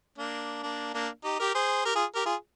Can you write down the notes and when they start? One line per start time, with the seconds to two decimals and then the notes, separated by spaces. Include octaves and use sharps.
0.18 A#3 D4
0.63 A#3 D4
0.94 A#3 D4
1.24 D#4 G4
1.39 G4 A#4
1.55 G#4 C5
1.85 G4 A#4
1.95 F4 G#4
2.15 G4 A#4
2.25 F4 G#4